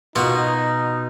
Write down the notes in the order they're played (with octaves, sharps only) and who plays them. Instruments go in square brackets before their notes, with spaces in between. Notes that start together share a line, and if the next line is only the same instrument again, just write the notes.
[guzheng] B2 [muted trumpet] D#4 [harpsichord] F4 F#4